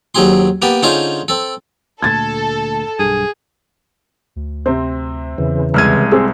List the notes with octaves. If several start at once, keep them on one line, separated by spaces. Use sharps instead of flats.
D#2 F#3 C4 G#4 C6
A#3 B3 G4 A5
D3 C#4 D#4 F4 G#4 C5
C4 A4
D2 A#2 A3 A4 G#6 A6
B1 G2 G#4
D2
C3 C4
E2 C#3 E3
C2 G#3 E6 F6 G#6 D#7
C4 G#4 E6